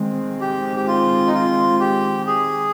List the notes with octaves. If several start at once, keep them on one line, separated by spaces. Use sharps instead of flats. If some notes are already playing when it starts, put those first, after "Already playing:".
Already playing: D#3 G#3 C4
G4
G4
F4
D#4
F4
G4
G#4